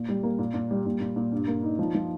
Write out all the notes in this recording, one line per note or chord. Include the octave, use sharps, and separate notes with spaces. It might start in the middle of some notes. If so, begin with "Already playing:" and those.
Already playing: A#2
G3
A#3
A#2
A#2
G3
A#2
A#2
A#2
G2
A#3
D#4
F3
F3